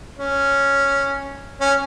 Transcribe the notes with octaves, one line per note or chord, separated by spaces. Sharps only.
C#4
C#4